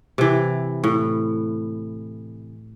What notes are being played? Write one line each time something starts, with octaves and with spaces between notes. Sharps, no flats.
C3 E3
A2